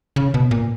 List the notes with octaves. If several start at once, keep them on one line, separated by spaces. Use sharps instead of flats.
C#3
B2
A#2